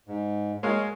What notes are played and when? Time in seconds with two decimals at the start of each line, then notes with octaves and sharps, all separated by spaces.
0.08 G#2
0.63 G#3 A#4 C#5 F5